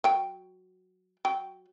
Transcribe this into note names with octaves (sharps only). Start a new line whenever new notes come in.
F#3 G5
F#3 G5